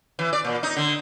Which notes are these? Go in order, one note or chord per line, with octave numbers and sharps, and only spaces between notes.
E3
D5
A#2
D#4
D3